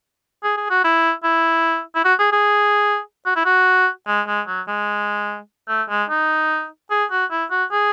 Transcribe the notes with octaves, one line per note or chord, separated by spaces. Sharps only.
G#4
G#4
F#4
E4
E4
E4
F#4
G#4
G#4
F#4
E4
F#4
G#3
G#3
F#3
G#3
A3
G#3
D#4
G#4
F#4
E4
F#4
G#4